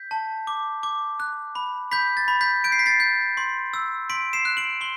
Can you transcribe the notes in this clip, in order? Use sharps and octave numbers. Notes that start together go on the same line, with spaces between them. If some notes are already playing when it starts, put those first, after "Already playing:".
Already playing: G6 B6
A5
D6
D6
F#6
B5
B5 G6 B6
A6
B5
G6 B6
G6 D7
C7
B6
A6 C7
G6
C6
E6
C6 B6 D7
C7 E7
F#6
D7 F#7
C6 G7